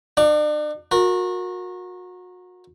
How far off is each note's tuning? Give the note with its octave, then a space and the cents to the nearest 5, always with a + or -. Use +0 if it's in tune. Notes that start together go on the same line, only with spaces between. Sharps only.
D4 +40 F5 +45 D6 +0
F#4 -30 A#4 +0